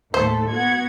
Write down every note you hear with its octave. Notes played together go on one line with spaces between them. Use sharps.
D#2 A2 A3 A4 C5
B3 F#4 F#5 G#6